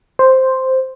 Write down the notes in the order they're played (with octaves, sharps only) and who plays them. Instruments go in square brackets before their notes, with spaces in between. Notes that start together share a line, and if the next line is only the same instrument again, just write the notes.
[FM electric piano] C5